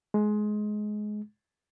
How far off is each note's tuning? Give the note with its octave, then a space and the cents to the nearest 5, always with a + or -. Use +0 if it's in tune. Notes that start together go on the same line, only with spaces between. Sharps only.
G#3 +20